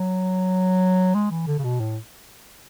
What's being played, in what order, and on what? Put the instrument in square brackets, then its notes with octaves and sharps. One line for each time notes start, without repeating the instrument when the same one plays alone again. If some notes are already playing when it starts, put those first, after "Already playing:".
Already playing: [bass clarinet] F#3
G#3
E3
D3
C#3
B2
A2